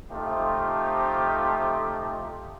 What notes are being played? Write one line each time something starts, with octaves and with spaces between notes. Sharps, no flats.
C3 F3 A3 D#4 F4 G4